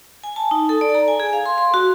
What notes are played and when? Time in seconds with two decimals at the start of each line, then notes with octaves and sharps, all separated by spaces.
0.24 G#5
0.36 A5
0.51 D#4
0.69 A4
0.81 D5
0.95 A#5
1.08 G#5
1.20 G#4
1.33 F5
1.46 C6
1.58 C6
1.74 F#4